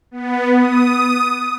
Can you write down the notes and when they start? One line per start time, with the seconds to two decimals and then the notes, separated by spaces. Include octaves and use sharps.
0.11 B3
0.55 D#6